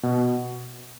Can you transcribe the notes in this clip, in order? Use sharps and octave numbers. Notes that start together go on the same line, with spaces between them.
B2